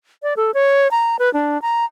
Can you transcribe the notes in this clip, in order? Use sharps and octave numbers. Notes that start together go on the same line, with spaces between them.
D5
A4
C#5
A#5
B4
D4
A#5